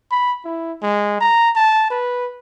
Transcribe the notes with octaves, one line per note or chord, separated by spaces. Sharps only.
B5
E4
G#3
A#5
A5
B4